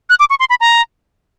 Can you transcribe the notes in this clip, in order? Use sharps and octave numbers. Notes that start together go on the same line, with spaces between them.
F#6
D6
C#6
C6
B5
A#5